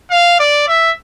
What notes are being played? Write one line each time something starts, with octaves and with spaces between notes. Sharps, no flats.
F5
D5
E5